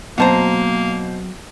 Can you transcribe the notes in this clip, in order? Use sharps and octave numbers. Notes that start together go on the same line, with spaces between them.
B2 F#3 A#3 C4 C5 F#5 A5 A#5